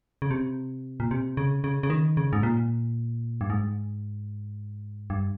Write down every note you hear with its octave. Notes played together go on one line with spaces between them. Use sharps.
C#3
C3
A#2
C3
C#3
C#3
C#3
D#3
C#3
G#2
A#2
G2
G#2
G2